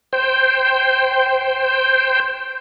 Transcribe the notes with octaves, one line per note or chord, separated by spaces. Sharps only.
C5 G5